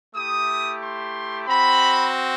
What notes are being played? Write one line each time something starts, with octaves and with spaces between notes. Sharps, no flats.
A3 E4 G4 D#6
C6
C4 F#4 B5